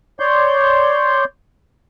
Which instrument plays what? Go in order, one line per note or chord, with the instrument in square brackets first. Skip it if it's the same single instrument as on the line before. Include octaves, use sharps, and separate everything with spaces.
[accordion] C#5 D5 C6 G6